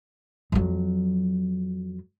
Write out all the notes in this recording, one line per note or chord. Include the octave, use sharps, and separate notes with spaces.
F2 F#3